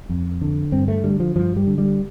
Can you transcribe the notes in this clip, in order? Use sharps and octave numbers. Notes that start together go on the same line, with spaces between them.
F2
D3
G2 C4
A3
D3 G3
F3
G2 F3
G3
D3
G3